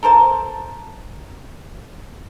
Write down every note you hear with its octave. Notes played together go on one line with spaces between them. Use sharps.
A4 A#4 C5 A5